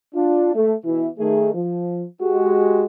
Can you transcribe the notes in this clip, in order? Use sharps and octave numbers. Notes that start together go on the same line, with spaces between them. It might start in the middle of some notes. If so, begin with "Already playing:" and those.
D4 F4
A3
B2 E3 E4
D#3 A3 G#4
F3
G#3 F#4 G4